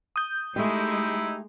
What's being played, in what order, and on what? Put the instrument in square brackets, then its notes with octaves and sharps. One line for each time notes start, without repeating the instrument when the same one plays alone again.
[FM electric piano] D#6 G6
[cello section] G#3 [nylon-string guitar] A3 G4 [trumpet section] D#4 E4